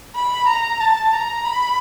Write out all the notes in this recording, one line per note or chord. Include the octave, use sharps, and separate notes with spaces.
B5
A#5
A5
A#5
B5